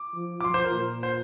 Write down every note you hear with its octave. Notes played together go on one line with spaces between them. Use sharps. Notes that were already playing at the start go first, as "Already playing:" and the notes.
Already playing: D6
F3
D6
F3 C6
C5
A#4
A#2
C5